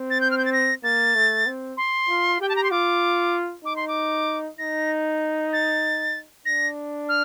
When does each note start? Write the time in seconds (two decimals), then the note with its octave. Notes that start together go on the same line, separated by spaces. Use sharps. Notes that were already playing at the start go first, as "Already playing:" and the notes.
Already playing: C4
0.10 A6
0.21 G6
0.31 F6
0.38 G6
0.45 A6
0.53 A#6
0.84 A#3 A6
1.15 A3
1.46 C4
1.77 C6
2.09 F4
2.40 G4 G5
2.49 A5
2.56 A#5
2.64 C6
2.71 F4 D6
3.65 D#4 D6
3.76 C6
3.88 D6
4.58 D#4 A#6
5.53 A6
6.45 D4 A#6
7.09 F6